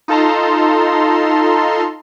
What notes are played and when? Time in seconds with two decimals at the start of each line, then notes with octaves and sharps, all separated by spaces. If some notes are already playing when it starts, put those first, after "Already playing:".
0.08 D#4 F4 A4 A5 A#5 C6